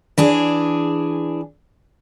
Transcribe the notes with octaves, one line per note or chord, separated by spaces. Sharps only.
E3 D4 G#4